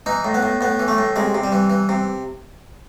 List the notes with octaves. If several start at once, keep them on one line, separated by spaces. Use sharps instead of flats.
E3 D#4
A2
B3
A2
A2 B3
E3
A3
A2
C3 G#3
C3
G3
E3
E3
C3